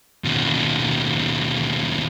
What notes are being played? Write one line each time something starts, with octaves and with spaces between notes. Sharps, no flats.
D#2 B2